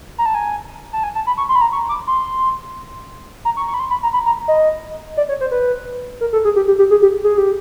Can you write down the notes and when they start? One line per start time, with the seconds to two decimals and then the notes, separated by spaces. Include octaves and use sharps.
0.18 A#5
0.26 A5
0.35 G#5
0.93 A5
1.04 G#5
1.15 A5
1.27 B5
1.37 C#6
1.49 C6
1.56 B5
1.61 A#5
1.72 C#6
1.89 D6
2.07 C6
3.45 A#5
3.57 C#6
3.68 C#6
3.74 B5
3.79 C6
3.90 B5
4.03 A#5
4.13 B5
4.26 A#5
4.48 D#5
5.17 D5
5.29 C#5
5.41 C5
5.51 B4
6.21 A#4
6.33 A4
6.45 G#4
6.56 G4
6.68 G4
6.79 G4
6.91 G#4
7.02 G4
7.24 G#4
7.38 G4